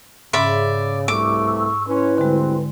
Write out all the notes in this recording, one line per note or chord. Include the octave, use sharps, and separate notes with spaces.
G#2 C#3 D5 E5 B5
C2 G2 A3 C#6 D6 E6
C#4 E4 B4 C6
D2 D3 G3 G#3 C4